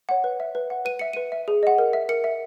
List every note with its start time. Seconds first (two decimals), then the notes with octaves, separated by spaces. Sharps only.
0.09 C#5 F#5
0.24 B4
0.40 E5
0.55 B4
0.70 F#5
0.85 B4 D#7
0.99 E5 C#7
1.13 B4 D#7
1.32 E5
1.48 G#4
1.63 D#5 F#5
1.78 A#4
1.93 E5
2.09 A#4 C#7
2.24 E5